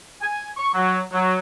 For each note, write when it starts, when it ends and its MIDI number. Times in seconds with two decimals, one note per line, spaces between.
0.22 0.47 80
0.57 0.70 85
0.75 1.00 54
1.12 1.39 54